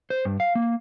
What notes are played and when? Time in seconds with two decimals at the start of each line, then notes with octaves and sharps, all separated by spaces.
0.10 C5
0.25 G2
0.40 F5
0.55 A#3